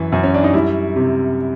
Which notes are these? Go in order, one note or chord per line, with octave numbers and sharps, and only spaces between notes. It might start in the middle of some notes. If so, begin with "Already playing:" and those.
Already playing: F#2 E3
F#2
C#4
D4
D#4
G3 E4
C3